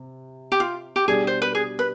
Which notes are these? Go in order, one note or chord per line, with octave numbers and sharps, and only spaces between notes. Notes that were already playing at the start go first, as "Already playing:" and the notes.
Already playing: C3
G4
F4
G4
B2 G3 D4 G4 G#4 D5
C5
B4
G#4
B4